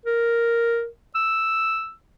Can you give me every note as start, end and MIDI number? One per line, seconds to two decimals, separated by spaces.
0.06 0.87 70
1.15 1.93 88